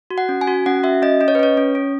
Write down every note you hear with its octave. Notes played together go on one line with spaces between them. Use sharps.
F#4
F#5
C#4
G#5
F#4
C#4 F#5
F#4 E5
C#4 D#5
C#4 D#5
C#5
B4
C#4 C#5
C#4
C#4